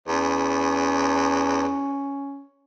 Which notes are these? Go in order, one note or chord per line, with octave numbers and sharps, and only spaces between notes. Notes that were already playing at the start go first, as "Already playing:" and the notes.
E2 C#4